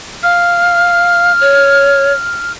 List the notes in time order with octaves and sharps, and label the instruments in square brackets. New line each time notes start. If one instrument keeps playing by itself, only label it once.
[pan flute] F5 [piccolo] F6
[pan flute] C#5